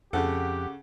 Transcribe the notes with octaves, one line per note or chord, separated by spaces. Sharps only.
F2 C#3 G4 A4 F#5